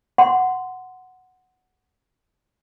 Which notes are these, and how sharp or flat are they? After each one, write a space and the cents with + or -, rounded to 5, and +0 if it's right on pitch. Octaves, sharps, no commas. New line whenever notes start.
F#5 +0 C6 -15